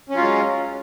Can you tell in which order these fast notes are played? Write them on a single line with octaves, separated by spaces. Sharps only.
C#4 F#3 F4 G#3